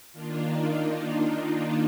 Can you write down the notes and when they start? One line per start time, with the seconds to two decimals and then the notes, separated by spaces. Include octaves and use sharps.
0.12 D#3 A#3 D4 F4
0.45 D#4